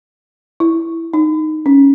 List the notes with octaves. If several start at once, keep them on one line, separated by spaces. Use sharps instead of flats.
E4
D#4
C#4